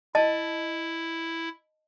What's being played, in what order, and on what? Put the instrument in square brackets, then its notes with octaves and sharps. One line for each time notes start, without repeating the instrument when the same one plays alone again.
[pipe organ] E4 [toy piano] D#5 A5